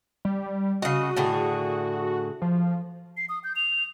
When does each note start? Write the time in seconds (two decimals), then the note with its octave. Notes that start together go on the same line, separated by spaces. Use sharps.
0.25 G3
0.82 C#3 F#4 D#5
1.17 A2 D3 G#4
2.42 F3
3.17 C7
3.29 D#6
3.44 G6
3.56 F7